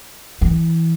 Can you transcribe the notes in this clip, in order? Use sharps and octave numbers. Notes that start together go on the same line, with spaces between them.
E3